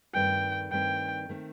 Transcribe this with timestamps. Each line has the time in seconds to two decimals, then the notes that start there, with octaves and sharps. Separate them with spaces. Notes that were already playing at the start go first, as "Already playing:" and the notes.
0.14 G2 D#3 A3 C4 G5
0.72 G2 D#3 A3 C4 G5
1.29 D#3 A3 C4